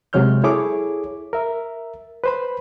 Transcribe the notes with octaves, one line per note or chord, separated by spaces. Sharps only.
C3 F#3 G#3 C#5 F6 G6
E4 G#4 A4 C#5 D6
A#4 E5
B4 C5 B5